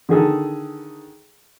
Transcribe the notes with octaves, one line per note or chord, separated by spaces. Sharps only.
D3 D#3 G#4 A4